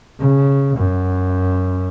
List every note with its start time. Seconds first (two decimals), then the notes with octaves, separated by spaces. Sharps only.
0.20 C#3
0.77 F#2